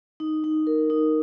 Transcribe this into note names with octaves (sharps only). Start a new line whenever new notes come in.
D#4
D#4
A#4
D#4